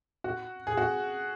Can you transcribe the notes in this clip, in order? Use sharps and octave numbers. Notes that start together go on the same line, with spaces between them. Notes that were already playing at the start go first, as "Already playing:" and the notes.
F#4
G#4
F#4